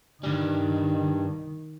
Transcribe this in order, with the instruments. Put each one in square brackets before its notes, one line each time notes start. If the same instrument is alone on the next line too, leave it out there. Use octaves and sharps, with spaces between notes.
[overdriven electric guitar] G2 G3 [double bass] D#3